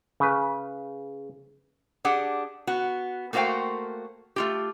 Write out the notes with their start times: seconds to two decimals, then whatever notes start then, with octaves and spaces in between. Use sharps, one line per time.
0.20 C#3 B4
2.05 D4 G4 G#4 F#5
2.67 B3 F#4
3.33 A3 A#3 F#4 C5 F5 G5
4.36 A3 F4 G4